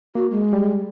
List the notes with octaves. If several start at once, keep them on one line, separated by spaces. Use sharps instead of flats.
A#3 F#4
G#3
G3